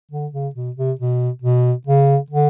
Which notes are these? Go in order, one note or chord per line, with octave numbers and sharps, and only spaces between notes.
D3
C#3
B2
C3
B2
B2
C#3
D3